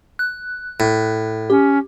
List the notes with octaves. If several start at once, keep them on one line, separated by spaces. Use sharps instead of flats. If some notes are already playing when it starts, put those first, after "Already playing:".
F#6
A2
C#4 G4